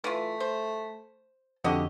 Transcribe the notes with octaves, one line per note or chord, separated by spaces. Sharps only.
E3 A3 F4
C5
F2 D3 F#4 G4 D#5